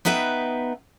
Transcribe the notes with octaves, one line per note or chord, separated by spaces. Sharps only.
B3 D#4 B4 E5 G5